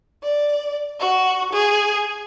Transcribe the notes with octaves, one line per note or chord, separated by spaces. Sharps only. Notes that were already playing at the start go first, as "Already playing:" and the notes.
D5
F#4
G#4